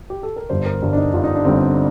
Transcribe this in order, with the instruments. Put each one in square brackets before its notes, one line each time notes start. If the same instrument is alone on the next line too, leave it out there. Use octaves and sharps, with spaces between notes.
[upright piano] G4
A4
A#4
G1 G2 D3 C5
A#4
G1 G2 D3 D4
D4
D#4
G1 G2 D3 F4
D#4
D4
G1 G2 D3 C4